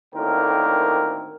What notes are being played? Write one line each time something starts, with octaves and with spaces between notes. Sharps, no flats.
D2 A2 D#3 A#3 C4 A#4